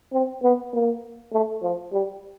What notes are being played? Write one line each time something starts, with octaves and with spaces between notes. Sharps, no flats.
C4
B3
A#3
A3
F3
G3